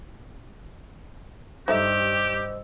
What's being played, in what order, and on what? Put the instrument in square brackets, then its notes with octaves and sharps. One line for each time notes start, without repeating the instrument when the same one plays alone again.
[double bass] G2 [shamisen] D#4 A4 E5 [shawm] G4 [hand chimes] C5 D#5 E6